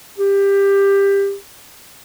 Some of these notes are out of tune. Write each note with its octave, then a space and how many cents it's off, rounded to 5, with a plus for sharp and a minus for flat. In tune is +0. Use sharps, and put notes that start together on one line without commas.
G4 +20